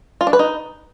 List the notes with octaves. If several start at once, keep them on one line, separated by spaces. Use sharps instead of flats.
F4
D4
B4
D#4